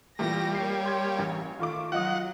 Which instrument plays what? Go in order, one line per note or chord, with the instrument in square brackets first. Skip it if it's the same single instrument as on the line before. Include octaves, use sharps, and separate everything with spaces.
[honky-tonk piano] A#2 E3 A3 [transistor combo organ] G3 [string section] A#6
[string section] A#3 C#5 [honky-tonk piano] C7
[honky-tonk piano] C6 G#6
A1
[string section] D#3 A3 [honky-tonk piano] F4 C#6 D6
[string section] F#3 [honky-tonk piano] F4 D#5 D#6 [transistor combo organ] F#5